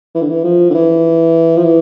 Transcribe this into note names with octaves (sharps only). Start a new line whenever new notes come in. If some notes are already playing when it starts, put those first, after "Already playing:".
E3
D3
E3
F3
D3
E3
F3
E3